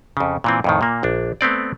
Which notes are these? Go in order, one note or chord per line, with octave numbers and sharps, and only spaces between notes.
F2 C#3
A#2 E3 C4
F2 A2 D#3
A#2 A#3
A#1 D4
A3 B3 C4 D5